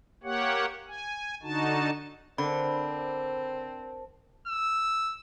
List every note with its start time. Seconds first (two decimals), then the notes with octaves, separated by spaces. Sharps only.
0.24 A#3 G4 C#5 F#5
0.88 G#5
1.43 D3 D#4 F#4 A5
2.38 D3 C4 A#4 C5 A5 B5
4.47 E6